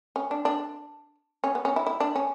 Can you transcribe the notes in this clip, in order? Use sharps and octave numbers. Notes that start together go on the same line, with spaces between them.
C#4
D4
D4
C#4
B3
C#4
E4
E4
D4
C#4